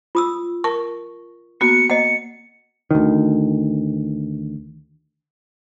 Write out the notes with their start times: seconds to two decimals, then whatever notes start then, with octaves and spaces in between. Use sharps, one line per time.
0.15 F4 D#6 E6
0.64 A#4 A5 C#6
1.61 A#3 B3 F#4 C#7
1.90 A#3 D#5 F#5 C#7
2.91 D2 D#3